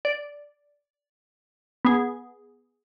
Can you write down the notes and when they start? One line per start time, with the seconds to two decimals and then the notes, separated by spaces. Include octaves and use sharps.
0.05 D5
1.85 B3 G#4